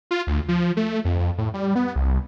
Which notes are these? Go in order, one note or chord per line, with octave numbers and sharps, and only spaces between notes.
F4
D2
F3
A3
F2
F2
A2
G3
B3
C2